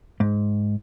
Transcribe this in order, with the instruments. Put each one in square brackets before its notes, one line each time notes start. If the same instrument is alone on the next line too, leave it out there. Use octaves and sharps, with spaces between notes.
[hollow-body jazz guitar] G#2